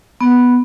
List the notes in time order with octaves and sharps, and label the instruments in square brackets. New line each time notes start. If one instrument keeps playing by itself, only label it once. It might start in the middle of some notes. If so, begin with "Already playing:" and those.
[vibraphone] B3